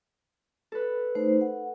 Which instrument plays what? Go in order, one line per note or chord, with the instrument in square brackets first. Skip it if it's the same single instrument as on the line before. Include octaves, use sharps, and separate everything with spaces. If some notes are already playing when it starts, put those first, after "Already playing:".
[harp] A4 B4
[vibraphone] A3 D#4 C5
F#5